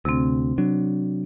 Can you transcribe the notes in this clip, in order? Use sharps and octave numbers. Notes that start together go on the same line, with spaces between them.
D2 C3 C4
F#3 D4